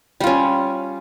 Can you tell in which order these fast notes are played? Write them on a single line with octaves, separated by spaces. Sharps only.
G3 F4 C#4